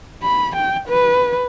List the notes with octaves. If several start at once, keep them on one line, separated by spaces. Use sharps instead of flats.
B5
G5
B4